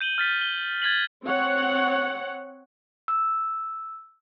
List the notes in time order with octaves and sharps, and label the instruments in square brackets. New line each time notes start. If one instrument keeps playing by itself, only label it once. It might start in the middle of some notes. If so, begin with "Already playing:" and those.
[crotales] G6 D#7 F#7 G7
F6 A6 B6
G7
G#6 A6 B6 F#7
[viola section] C4 C#5 F#5
[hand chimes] E6